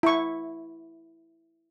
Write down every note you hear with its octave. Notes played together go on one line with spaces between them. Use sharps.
E4 C#6